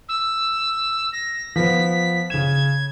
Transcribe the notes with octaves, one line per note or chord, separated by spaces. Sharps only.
E6
A#6
F3 B3 B6
C#3 G#6 E7